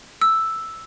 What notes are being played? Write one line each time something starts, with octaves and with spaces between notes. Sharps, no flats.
E6